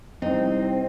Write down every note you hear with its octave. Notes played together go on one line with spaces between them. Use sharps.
C2 C4 D#4